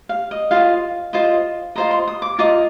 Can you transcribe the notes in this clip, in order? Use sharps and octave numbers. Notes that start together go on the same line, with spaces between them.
F5
D#5
F4 C5 D#5 F5
F4 C5 D#5
F4 C5 D#5 A#5
C6
D#6
D6
F4 A#4 D#5 D6